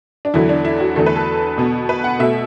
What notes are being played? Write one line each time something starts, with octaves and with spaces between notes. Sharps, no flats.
D4
E2 D3 F#3 E4
D4
E4
F#4
E2 D3 A3 A4
B4
A4
B2 B3
B4
F#5
B2 A3 E5